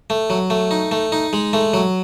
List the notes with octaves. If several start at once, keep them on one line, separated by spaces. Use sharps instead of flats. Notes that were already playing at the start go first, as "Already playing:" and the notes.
A3
F#3
A3
D#4
A3
D#4
G#3
A3
F#3